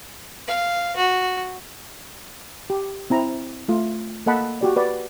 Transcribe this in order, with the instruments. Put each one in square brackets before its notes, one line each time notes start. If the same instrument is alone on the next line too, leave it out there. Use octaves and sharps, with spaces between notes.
[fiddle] F5
F#4
[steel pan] G4
C4 E4 A#5
A3 F4
A#3 A4 D#5 F#5 A5 B5
F#4 G4 D5
B4 D5 F#5